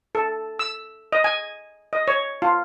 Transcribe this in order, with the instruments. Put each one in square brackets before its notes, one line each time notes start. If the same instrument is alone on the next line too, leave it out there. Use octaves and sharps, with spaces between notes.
[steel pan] A4
E6
D#5
G#5
D#5
C#5
F4